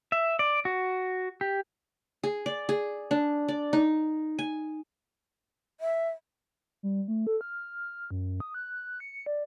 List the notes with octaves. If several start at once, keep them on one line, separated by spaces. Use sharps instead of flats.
E5
D5
F#4
G4
G#4
D5
G#4
D4
D5
D#4
G#5
E5
G3
A3
A4
F6
F#2
D#6
F#6
C#7
D5